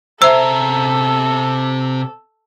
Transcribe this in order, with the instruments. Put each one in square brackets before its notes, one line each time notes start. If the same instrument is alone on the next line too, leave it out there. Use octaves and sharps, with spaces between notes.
[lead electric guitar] C3 A#5 [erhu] A4 [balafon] C5 E5 [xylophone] E6